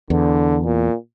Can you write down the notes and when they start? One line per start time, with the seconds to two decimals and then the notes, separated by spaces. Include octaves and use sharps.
0.10 E2 D3
0.65 A#2